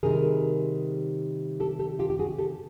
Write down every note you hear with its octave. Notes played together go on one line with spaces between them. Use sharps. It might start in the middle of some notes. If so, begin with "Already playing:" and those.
C3 D#3 G3 C4 D#4 G#4 A#4
G4 A4
G4 A4
F4 G4
G4
F#4 G#4
G4 A4